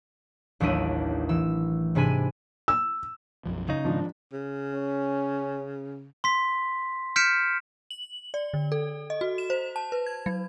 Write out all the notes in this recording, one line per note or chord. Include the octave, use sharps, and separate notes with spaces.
A1 D#2 F#3 D4 E4 D#7
E3 E6
G#2 C3 D4 G#5 B5 D#7
E6
B1 F#2 F3
C#3 D#4
G#2 D#3 F3 D4
C#3
C#4
C6 B6
F6 G6 B6 C#7 D7 E7
F#7
D5
D3
A4
D#5
F#4
E7
C5
A5
B4
G#6
F#3